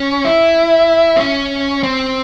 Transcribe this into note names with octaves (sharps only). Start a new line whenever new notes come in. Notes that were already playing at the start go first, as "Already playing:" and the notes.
Already playing: C#4
E4
C4
C#4
C4